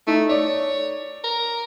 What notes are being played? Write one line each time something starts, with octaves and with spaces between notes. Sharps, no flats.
A3 D#4
C#5 D5
A#4